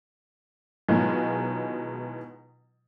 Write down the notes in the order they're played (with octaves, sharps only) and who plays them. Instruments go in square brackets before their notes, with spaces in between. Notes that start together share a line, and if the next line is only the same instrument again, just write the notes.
[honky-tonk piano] B2 D#3 E3 F#3 G#3 F4